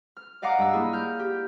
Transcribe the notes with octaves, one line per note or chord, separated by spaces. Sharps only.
F6
D5 D#5 F5 F#5 A#5 D6
G2 E6
A#3 E4 G#4
F6 G6
G4